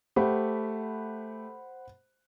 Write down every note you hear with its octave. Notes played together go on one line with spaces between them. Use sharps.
A3 G4 C5 F#5 B5